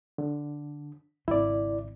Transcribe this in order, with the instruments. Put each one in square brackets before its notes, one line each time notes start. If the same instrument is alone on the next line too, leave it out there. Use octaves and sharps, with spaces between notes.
[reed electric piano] D3
[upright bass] G#1 C#3 [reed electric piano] E4 D5